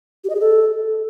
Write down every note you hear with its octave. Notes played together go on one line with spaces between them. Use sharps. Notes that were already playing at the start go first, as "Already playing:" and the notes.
G4
D#5
G#4
A4